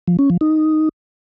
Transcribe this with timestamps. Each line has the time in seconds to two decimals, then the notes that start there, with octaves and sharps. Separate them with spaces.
0.08 F3
0.19 C#4
0.30 F3
0.41 D#4